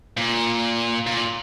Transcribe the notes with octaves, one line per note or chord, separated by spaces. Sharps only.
A#2
A#2